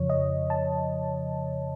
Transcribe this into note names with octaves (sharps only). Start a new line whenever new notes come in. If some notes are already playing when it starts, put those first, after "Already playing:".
Already playing: F2 C#3 F3 C#5
D#5
A5